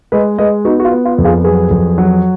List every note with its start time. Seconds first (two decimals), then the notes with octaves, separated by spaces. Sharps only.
0.12 G#3 B4 D#5
0.38 G#3 B4 D#5
0.65 B3 D#4 F#4
0.80 F#4
0.85 F4
0.92 B3
1.05 F4
1.18 F2
1.24 F4 G#4
1.44 F#3 G#4 B4
1.71 F2
1.98 F#3